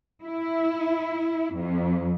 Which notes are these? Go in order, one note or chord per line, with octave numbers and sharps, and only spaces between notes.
E4
F2